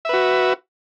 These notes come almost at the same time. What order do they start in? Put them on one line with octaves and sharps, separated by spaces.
E5 B4 F#4